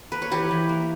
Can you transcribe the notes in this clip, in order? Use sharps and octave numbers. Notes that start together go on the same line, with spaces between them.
A#3 B4
C#5
E3 G4 B4
E3
A#3